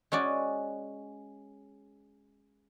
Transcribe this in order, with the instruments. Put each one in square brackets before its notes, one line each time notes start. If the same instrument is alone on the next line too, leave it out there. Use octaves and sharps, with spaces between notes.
[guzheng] G#3 C#4 F#4 D5